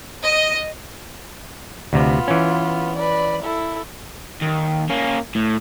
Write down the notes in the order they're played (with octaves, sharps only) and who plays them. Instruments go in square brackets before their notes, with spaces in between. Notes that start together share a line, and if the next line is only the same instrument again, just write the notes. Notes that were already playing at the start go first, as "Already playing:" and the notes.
[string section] D#5
[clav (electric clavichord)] D2 C3 [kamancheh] B3 F4
[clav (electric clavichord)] E3 C#4
[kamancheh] B4 D5
E4 A4
[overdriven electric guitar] D#2
A#3 C#4
A2